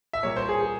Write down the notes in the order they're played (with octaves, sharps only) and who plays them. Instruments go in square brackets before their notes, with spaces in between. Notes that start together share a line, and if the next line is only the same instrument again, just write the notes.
[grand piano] E5
A#2 G3 A#3 C#5
C5
G#4
G#4